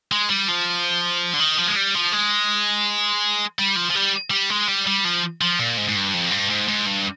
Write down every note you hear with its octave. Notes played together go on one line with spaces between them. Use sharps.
G#3
G3
F3
D3
D#3
F3
G#3
G3
F3
G#3
G3
F3
F3
G3
G3
G#3
G3
G3
F3
F3
A#2
G#2
G#2
G2
F2
G2
G#2
G#2
G2